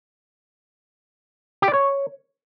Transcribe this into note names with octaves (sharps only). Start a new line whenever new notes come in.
G4
D5
C#5